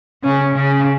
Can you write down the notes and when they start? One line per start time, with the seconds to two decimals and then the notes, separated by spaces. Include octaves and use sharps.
0.24 C#3 C#4
0.55 C#3